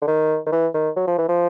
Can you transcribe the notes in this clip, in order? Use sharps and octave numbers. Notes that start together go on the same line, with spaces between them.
D3
D#3
D#3
E3
D#3
F#3
F3
E3
F3